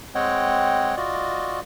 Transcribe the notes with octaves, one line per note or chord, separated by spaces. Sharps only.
G#3 C4 C#5 D#5 F#5 G5
F4 F#4 D5 D#5